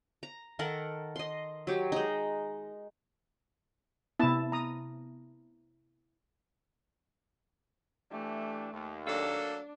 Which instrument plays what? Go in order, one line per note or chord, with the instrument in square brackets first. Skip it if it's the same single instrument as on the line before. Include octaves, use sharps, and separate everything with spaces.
[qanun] A#5
D#3 A4 A#4 F#5
D#5 C6
F#3 G4
G#3 D#4
[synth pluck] C3 B3 [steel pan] E4 A5
[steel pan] A#5 D#6
[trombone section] E3 D4 G4 [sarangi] A3
[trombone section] D#2
[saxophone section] F#3 A#3 A4 [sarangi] D4